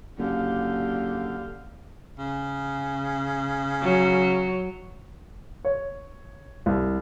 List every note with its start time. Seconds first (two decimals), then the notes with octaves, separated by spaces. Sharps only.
0.18 F#1 D3 G4 F5
2.19 C#3
3.82 F#3
5.65 C#5
6.66 C2